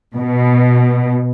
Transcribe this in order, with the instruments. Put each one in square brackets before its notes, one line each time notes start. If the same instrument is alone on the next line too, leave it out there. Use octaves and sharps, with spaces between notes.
[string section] B2